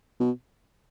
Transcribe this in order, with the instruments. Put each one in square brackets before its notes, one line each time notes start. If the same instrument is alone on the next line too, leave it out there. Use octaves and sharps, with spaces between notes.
[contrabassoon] B2